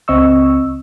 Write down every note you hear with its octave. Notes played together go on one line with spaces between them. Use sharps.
C#2 C4 D#5 C#6 E6